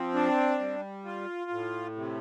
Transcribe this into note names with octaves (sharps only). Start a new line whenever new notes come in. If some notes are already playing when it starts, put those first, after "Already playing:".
Already playing: F3 C4
D4
G3
F4
A2
C3